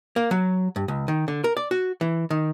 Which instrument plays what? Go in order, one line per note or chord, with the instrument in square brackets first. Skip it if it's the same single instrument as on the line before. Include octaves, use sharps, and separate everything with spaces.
[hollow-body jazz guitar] A#3
F#3
G2
C#2
D#3
D3
A#4
D5
F#4
E3
D#3